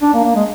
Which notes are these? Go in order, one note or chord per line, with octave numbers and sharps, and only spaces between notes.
D4
A#3
A#3
G#3